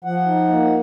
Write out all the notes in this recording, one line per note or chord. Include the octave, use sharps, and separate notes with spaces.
F3 F#5
D#4
A#3